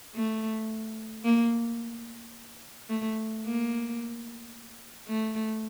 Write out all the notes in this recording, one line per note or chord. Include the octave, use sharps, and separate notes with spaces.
A3
A#3
A3
A#3
A3